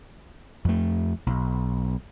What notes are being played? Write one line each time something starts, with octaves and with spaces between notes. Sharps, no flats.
F2 A3
B1